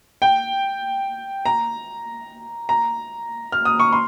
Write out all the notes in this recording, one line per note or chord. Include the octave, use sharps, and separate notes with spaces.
G5
A#5
A#5
F6
D#6
C#6
C6